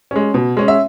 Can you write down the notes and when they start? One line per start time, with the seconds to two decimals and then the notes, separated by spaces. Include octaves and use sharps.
0.11 G#3 C#4
0.34 B2
0.57 G#3 C#4
0.68 E5